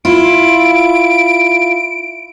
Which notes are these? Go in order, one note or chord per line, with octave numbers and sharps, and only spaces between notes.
E4 F4 D7